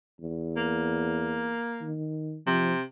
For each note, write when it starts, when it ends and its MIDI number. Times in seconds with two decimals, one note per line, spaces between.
0.20 1.60 40
0.56 1.95 58
1.81 2.38 51
2.47 2.81 48
2.47 2.73 53